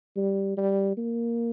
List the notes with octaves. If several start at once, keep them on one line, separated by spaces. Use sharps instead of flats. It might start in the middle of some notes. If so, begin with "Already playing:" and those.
G3
G3
A#3